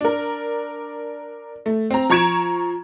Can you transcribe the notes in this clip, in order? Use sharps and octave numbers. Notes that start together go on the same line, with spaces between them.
D4 A#4
A3
C4 A#5
F3 A#5 C#6 G#6 D7 E7